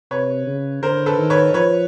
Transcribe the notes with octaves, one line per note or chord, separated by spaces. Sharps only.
C3 B4 C#5
C#3
D3 A#4 C5
A4 B4
D#3
B4 C#5
F3 B4 C#5